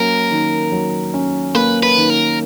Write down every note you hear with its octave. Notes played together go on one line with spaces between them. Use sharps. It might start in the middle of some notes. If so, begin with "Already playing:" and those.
Already playing: F#3 A#3 C#4 A#4
D#3
F#3
C#4
A#3 B4
B4
D#3
A#4